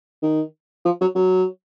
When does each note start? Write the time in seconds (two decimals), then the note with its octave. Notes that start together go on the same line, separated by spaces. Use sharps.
0.23 D#3
0.85 F3
1.01 F#3
1.16 F#3